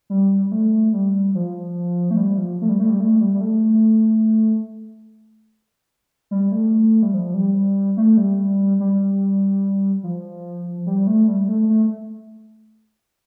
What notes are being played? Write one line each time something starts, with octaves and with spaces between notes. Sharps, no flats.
G3
G3
A3
G3
F3
A3
G3
F3
A3
G3
A3
G3
A3
G3
G3
A3
G3
A3
G3
F3
G3
A3
G3
G3
F3
G3
A3
G3
A3
A3